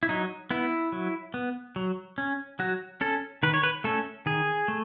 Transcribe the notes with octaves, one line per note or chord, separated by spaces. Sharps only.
E4
F#3 D#4
B3 E4
F#3
B3
F#3
C#4
F#3 F#4
C#4 A4
D#3 B4
C#5
B4
A3 C#4 A4
D#3 G#4
A3